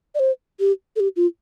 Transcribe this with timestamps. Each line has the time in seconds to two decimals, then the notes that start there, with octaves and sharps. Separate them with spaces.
0.15 D5
0.20 C5
0.60 G4
0.96 A4
1.00 G4
1.16 F4